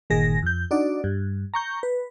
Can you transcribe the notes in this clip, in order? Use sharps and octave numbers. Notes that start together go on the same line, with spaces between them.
G1 A#2 D#3 G#4 A#6
F2 G6
D4 D#4 F#4 D5
G2
A#5 C#6 G6
B4